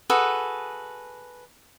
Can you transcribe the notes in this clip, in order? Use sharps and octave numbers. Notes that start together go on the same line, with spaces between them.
F#4 G#4 A4 B4